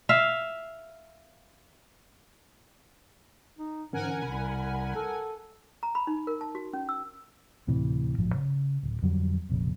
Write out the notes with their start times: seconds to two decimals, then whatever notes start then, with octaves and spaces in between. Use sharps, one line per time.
0.09 E5 F5
3.58 D#4
3.93 G#2 D3 E3 C#4 A#4 F#5 G#5
4.22 C2 C3 B5
4.96 A4
5.83 A#5
5.95 B5
6.07 D#4
6.27 A#4
6.41 A5
6.55 F#4
6.73 C#4
6.89 E6
7.67 D2 A2 C3 E3
8.18 A1 G#2 F3
8.35 C#3
8.83 D1
9.02 F2 D3 F#3 G3
9.49 F1 A#1 C#3